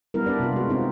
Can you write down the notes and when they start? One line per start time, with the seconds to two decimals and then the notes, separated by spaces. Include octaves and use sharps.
0.14 G3 B3 E4 A#4
0.26 D4 B4 D5
0.40 C3 F4
0.53 G#3 F#4
0.69 C4 D#4 F4